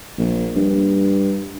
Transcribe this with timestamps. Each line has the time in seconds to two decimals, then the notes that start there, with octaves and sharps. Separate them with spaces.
0.18 A#1
0.56 G2